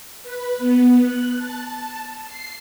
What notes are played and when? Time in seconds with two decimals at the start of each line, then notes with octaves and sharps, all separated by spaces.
0.23 B4
0.58 B3
0.99 F#6
1.36 A5
2.26 C7